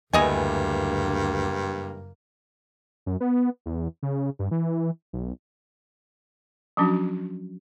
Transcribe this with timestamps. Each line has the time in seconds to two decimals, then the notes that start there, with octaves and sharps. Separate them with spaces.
0.13 F#1 D2 G2 E3 A#3 D#5 G#5
3.06 F#2
3.20 B3
3.66 E2
4.03 C#3
4.39 G2
4.51 E3
5.13 B1
6.77 F3 F#3 C#4 D4 F#4